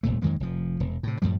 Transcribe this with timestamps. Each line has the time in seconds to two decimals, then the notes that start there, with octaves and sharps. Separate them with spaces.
0.03 D#1 G#1 A#2 A3
0.22 F2 D#3 G#3 A#3
0.40 F1 F3
0.80 E1
1.03 A2 C3
1.22 F#2 A2 F3 G3